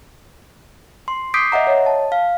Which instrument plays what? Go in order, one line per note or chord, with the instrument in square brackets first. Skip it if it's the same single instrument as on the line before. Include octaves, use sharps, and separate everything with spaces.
[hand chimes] C6
D6 D#6 G6 B6 C7 D7
D#5 E5 F#5 A#5
C#5 D#5
A5
F5